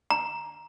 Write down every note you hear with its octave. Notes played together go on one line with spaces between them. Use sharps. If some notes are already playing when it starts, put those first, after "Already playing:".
A#5